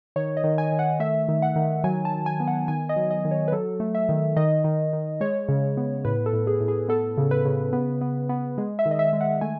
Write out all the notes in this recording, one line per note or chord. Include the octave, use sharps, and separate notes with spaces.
D#3 C#5
D#5
D#3
G#5
D#3
F#5
A3 E5
D#3
F#5
D#3
F#3 G#5
A5
F#3
G#5
B3
F#5
D#3 G#5
D#5
F#3
D#5
D#3
C#5
B4
F#3 A4
A3
E5
D#3
D#3 D#5
D#3
D#3
G#3 C#5
C#3
B3
A2 B4
A4
A2
G#4
A2
G#4
B3 A4
C#3
B4
C#3
B3
B3
B3
G#3
E5
D#3
D#5
E5
G#3
F#5
A3 G#5